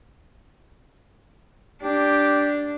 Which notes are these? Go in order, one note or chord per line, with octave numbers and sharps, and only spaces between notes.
D4 G4